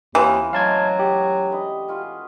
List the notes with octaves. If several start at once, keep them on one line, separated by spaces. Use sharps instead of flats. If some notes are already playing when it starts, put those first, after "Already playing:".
D#2 C#3 E3 C4 F4
F#3 G#3 A3 F#4 F5 A5 G#6
G4 C#5
D4 B4 D#5
C#4 F4 F#4